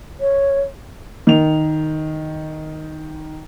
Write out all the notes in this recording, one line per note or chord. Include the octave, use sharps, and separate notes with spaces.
C#5
D#3 F7